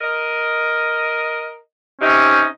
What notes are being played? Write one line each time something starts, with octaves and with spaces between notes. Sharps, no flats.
A#4 D#5
C3 C#4 D#4